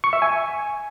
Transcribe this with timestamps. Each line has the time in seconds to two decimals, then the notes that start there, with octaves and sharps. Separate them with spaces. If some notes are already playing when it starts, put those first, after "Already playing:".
0.04 C#6
0.13 E5
0.22 G#5